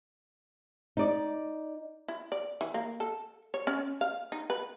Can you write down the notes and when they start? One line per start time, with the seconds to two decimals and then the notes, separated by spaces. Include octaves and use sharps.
0.97 D#4 D5
2.08 E4
2.32 D5
2.61 E3
2.74 A#3
3.00 A4
3.54 C#5
3.67 C#4
4.01 F5
4.32 D#4
4.50 B4